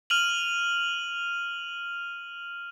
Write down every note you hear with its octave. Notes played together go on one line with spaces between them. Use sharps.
F6 D#7 F7 F#7